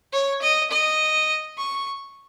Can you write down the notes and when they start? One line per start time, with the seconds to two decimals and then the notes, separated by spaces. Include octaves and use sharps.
0.13 C#5
0.42 D#5
0.71 D#5
1.58 C#6